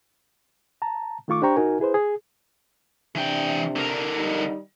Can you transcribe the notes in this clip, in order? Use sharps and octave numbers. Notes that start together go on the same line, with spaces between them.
A5 A#5
D#3 A3 F4 C#6 D6
D4 G4 C5 G5 A#5 C#6
C2 D#4 F#4 A#4 G#5
E4 G#4 B4 C5
G#4
C3 E3 D4 G5
D3 A#4
G3 D#4